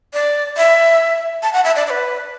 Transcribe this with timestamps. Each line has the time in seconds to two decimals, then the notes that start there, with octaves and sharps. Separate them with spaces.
0.13 D5
0.57 E5
1.42 A5
1.53 F#5
1.64 E5
1.76 D5
1.86 D5
1.90 B4